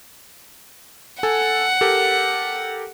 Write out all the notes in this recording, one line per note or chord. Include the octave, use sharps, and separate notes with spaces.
A4 F#5 G#5
G4 A4 A#4